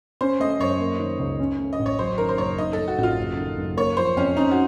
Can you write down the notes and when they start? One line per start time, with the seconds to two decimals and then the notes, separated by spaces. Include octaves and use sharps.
0.21 C#4 C5
0.40 A3 D#5
0.59 F#2 C#5
0.80 A#3
0.99 D#3
1.19 C#2
1.40 C#4
1.58 A3
1.73 D#5
1.79 A1
1.86 C#5
1.99 F#3 C5
2.18 D#3 A#4
2.29 C5
2.38 F#1 C#5
2.58 D#4 D#5
2.73 A3 A4
2.88 F#4
2.98 A1 F#4
3.03 F4
3.17 F#1
3.37 D#3
3.57 F#1
3.77 A#3 C#5
3.97 F3 C5
4.17 F2 C#4
4.36 C#4 D#4
4.51 F#4